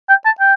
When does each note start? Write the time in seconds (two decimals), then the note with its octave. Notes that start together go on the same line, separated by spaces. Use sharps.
0.09 G5
0.26 A5
0.40 G5